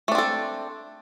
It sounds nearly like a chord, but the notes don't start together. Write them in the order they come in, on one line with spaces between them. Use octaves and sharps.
A3 D4 C4 A4